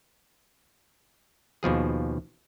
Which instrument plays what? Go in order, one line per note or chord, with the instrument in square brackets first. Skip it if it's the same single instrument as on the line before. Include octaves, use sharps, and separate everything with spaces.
[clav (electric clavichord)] D#2 B2 F3 G#4